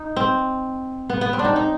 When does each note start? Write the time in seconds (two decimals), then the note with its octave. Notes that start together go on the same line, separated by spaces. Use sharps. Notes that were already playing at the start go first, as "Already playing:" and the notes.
Already playing: D#4
0.17 C4
1.10 B3
1.21 B3
1.33 C4
1.39 D4
1.45 D#4
1.56 D#4